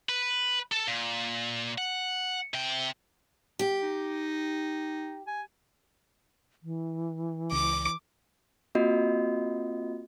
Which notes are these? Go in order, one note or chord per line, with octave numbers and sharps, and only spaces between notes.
B4
A4 A5
A#2
F#5
C3 G5
G4
D#4
G#5
E3
C#2 D6
A#3 C4 F4 F#4 D#5